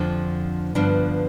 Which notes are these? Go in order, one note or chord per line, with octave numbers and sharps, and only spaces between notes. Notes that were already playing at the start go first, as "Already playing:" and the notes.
Already playing: F2 D3 F3
G2 D3 F3 B3 D4